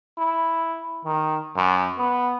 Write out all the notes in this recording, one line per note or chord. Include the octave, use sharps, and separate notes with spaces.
E4
D#3
F#2
B3